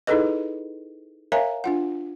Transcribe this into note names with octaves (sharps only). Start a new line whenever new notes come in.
D#4 E4 G#4 A4 B4 D#5
A#4 C#5 E5 F5 G#5 A#5
D4 F4 F#5